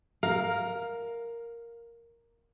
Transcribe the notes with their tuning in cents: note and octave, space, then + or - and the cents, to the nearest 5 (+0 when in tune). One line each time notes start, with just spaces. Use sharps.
A#4 +0 F5 +15